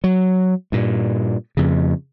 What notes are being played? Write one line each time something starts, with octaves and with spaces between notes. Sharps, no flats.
F#3
G2 A#2
F2 C#3